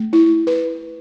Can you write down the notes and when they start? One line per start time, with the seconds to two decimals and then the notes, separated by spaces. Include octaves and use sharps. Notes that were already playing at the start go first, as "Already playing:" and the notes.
Already playing: A3
0.13 E4
0.47 B4